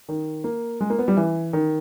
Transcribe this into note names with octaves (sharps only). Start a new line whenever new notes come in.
D#3
A#3
G#3
A#3
B3
G3
E3
D#3